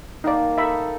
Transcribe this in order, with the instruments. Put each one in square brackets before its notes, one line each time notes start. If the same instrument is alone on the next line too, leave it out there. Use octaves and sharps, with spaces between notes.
[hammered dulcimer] D#3 A#3 [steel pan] D#4 D5
[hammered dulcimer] D#4 A4 [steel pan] E5 B5